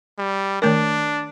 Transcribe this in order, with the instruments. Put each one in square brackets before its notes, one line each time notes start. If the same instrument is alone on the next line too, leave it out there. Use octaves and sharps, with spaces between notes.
[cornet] G3
[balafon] D#3 A3 A#4 [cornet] D4